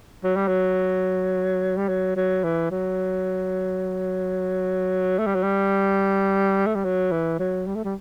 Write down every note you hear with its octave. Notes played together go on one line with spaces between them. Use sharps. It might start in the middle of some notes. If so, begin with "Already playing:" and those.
F#3
G3
F#3
G3
F#3
F#3
E3
F#3
A3
G3
F#3
G3
A3
G3
F#3
E3
F#3
G3
A3
G3